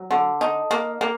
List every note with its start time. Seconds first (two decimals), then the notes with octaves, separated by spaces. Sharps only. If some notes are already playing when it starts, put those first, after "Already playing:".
Already playing: F#3
0.11 D3
0.41 D#4
0.71 A#3
1.01 A#3